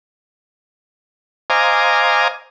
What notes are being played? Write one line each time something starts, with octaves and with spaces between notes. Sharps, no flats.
C5 D#5 F5 G#5 A#5 D6